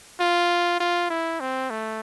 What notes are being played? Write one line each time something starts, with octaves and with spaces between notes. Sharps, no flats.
F4
F4
E4
C4
A3